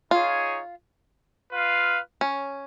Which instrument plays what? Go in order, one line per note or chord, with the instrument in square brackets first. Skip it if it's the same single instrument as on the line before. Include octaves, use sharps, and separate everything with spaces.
[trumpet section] D#4 G#4 C#5 [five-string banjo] F4
[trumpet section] F4 B4 F5
[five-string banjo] C#4